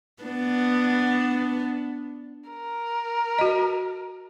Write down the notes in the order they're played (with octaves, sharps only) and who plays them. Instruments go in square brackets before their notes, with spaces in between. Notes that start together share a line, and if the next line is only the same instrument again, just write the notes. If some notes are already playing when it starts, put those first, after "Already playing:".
[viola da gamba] B3 D4
[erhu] A#4
[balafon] F#4 D#5